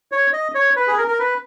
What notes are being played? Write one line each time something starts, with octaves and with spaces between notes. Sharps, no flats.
C#5
D#5
C#5
B4
G#4
A#4
A#4
B4